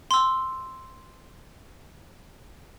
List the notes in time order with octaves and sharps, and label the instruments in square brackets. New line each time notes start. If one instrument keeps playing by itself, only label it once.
[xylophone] C6 E6